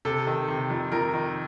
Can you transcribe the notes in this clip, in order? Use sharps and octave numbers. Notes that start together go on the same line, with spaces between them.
C3 A4
D#3
C3
F2
F2 A#4
D#3